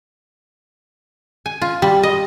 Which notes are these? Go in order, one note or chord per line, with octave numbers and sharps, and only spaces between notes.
G#5
F4
G3
D#5